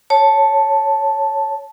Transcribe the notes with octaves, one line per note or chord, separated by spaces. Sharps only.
C#5 A5